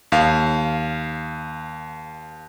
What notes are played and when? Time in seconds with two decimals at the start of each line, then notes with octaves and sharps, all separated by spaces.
0.12 D#2 F5